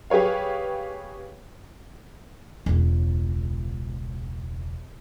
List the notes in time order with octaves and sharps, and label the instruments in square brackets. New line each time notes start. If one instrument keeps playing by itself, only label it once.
[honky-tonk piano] G4 G#4 B4 C#5 F5
[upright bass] E1 C#2